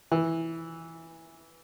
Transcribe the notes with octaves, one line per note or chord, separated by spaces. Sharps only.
E3